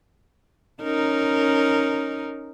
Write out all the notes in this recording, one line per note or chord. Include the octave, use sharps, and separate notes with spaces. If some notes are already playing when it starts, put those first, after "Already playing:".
C#4 D#4 A#4